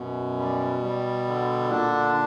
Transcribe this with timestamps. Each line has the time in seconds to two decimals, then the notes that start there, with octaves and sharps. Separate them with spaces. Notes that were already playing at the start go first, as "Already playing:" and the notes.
Already playing: F#2 B2
0.38 G3
0.82 G3
1.27 D3
1.71 A#2 D4